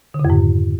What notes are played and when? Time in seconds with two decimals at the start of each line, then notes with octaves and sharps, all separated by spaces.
0.14 D3
0.19 C#3
0.25 F2
0.30 G#2